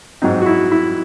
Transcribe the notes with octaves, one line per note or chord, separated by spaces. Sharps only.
G#2 F#3 C4 D#4
F#4
E4
E4